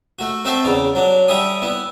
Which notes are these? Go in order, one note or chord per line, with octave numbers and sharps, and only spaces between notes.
A3 F#4
A3 C4 A4 C5 E5
E2 C#3 D5
F#3 D4
D3 G3 E5 G#5 D#6
B3 E4